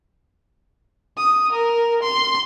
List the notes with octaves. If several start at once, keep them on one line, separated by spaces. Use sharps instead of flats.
D#6
A#4
C6